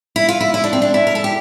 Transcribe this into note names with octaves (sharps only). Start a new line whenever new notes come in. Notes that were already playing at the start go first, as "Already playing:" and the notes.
E4
F4
E4
E4
D4
C4
D4
E4
A#4
A4
G4